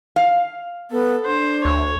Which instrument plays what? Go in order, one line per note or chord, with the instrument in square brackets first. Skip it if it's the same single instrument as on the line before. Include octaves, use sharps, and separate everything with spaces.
[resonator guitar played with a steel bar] F5
[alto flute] B3 [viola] A4
[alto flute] D4 [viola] C5
[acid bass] D2 [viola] C#5